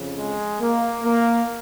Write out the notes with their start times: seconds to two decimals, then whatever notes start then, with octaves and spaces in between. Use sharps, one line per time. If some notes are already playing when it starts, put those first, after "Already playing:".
Already playing: F2 C#3 F3
0.17 G#3
0.61 A#3
1.04 A#3